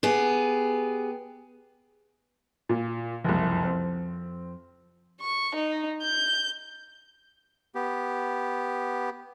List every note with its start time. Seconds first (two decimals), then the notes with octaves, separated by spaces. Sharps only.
0.03 B3 G4 G#4
2.69 A#2
3.24 F#1 C2 F2 F3
3.64 C4
5.21 C#6
5.55 D#4
6.02 G6
7.75 B3 G4